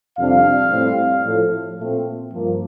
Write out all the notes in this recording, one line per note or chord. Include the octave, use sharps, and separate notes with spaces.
F2 C3 G3 D4 F5
A2 G3 C4
A2 F3 A3
A#2 A3 C4
G2 F3 A#3